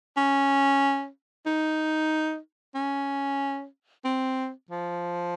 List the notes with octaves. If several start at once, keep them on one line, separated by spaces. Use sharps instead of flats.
C#4
D#4
C#4
C4
F3